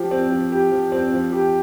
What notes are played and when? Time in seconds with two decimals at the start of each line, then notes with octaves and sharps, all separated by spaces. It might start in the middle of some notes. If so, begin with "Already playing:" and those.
Already playing: F3 G4
0.11 C4
0.30 F3
0.52 G4
0.71 F3
0.92 C4
1.13 F3
1.33 G4